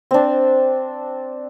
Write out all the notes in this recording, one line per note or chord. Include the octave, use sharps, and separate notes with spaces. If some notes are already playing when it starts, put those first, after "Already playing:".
C4 D4